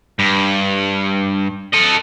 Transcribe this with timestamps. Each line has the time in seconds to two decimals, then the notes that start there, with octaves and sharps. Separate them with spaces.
0.19 G2
1.73 A4 D#5